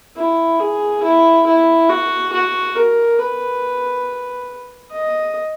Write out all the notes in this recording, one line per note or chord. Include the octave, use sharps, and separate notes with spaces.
E4
G#4
E4
E4
F#4
F#4
A#4
B4
D#5